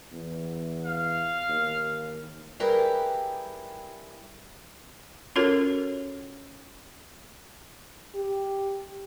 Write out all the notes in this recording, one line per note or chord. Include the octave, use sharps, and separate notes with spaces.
E2
F5
D#2
G3 E4 G4 G#4 A#4 B4
C#4 F4 F#4 A4 A#4 C#5
G4